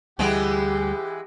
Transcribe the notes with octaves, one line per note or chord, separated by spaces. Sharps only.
D2 E3 G3 G#3 B3 G4